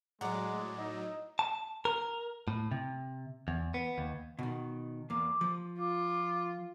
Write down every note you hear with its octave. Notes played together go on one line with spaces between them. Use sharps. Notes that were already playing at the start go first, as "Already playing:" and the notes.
A2 F#3 G#3 D5 F#5 A#5
D#4 D#5 E6
A5
A#4
A2
C3
E2
B3
D#2
B2 D#3
E2 A#3 D6
F3
F4 D6